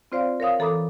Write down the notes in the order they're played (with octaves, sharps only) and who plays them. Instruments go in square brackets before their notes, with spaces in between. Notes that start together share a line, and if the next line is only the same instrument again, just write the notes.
[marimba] C4 F4 C5 D5 F5
A#4 C#5 F5 D#6
E3 A4 A#5 B5 D6 D#6